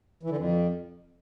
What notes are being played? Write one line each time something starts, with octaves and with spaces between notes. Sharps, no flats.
E3
D3
F2